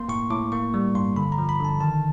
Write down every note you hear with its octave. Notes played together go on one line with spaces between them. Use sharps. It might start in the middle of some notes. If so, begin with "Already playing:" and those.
Already playing: A#3 C6
A2 C#6
A2 D6
A#3 C#6
G3
G2 C6
D3 B5
A#5
F3
B5
D3 A5
D#3 A5